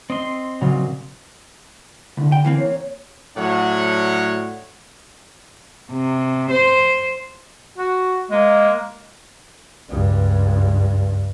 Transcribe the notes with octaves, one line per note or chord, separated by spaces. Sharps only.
C4 D#5 C6
A#2 C#3 F#3
C2 D3
G5
E3 A#3 C4
C#5
A2 F#3 D4 C#5 F#5
C3
C5
F#4
G#3 A#3
C#2 G2